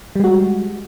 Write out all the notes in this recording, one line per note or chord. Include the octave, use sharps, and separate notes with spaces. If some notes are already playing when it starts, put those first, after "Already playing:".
G3 G#3 F#4